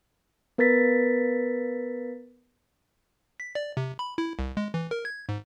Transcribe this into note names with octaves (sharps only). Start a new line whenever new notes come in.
B3 A#4 B4 A6 B6
B6
D5
C3
B5
E4
C2
G#3
E3
A#4
G#6
G#2